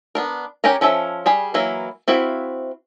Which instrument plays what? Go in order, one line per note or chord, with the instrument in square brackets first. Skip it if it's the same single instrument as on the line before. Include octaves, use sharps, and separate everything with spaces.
[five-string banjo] B3 D4 A#4
C#4 G4 A#4 G#5 A#5
F3 C#4 F4 A4 E5
G3 G#4 B5
E3 F#3 A#3 E4
C4 E4 F#4 E5 F5